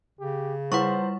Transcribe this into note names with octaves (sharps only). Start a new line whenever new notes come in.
C#3 G4
G3 E4 B4 C5 F#5 C#6